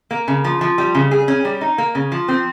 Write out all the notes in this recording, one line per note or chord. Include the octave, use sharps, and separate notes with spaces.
A#3
C#3
F3
F3
G3
C#3
G#4
C#4
G3
D#4
A#3
C#3
F3
C4